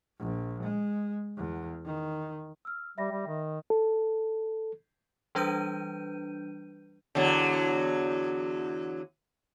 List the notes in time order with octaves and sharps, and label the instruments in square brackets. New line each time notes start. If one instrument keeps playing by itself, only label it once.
[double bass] A#1
G#3
E2
D#3
[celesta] E6 F6
[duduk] G3 [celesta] E5 B5 A#6
[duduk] G3
D#3
[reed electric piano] A4
[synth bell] E3 G3 D4 B4 G6 D#7
[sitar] E2 D3 F#3